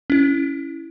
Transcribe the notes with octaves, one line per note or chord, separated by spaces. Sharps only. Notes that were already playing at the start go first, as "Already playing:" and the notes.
C#4 E4